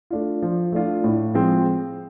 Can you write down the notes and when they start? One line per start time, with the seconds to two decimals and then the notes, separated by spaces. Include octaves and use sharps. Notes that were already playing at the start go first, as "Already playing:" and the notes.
0.10 A3 D4 F4
0.42 F3
0.72 A3 D4 F4
1.04 A2
1.34 F3 G#3 C4